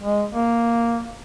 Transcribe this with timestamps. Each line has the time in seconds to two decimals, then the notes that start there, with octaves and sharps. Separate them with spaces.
0.01 G#3
0.34 A#3